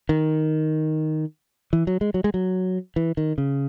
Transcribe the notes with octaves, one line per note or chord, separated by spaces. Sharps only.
D#3
E3
F#3
G#3
F#3
G#3
F#3
E3
D#3
C#3